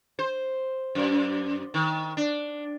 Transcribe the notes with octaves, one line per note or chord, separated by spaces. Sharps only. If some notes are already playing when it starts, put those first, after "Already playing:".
C5
F#2
D#3
D4